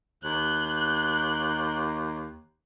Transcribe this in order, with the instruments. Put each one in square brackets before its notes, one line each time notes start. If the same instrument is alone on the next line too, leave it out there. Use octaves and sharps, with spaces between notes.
[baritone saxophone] D#2 [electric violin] F#6 G6